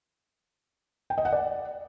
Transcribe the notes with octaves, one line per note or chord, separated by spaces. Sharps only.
G5
D#5
F#5
D5